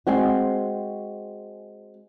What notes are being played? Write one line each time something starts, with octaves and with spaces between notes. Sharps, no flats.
G#3 C4 F#4